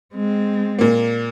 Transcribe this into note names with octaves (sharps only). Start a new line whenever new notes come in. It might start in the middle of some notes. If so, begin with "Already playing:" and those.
G#3 C4
A#2 A#3